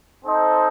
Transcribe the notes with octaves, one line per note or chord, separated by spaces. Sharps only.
C4 D#4 A4 C5 D#5